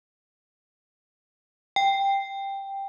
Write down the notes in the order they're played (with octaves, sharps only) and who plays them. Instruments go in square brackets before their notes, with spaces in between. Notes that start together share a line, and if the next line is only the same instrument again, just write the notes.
[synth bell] G5